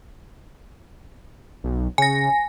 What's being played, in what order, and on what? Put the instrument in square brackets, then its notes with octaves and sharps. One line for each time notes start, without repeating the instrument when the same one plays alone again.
[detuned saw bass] B1
[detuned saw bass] C#3 [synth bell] G#5 A#6